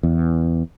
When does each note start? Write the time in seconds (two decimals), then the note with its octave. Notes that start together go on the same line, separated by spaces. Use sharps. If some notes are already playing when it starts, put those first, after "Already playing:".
0.03 E2